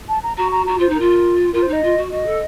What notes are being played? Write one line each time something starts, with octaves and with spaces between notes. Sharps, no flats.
A5
A#5
F#4 A#5
A#5
F#4 A#5
F4 C5
D#4
F4 A#4
F4 A#4
C5
D#4
D#5
F4
F#4
F#4 D#5
A4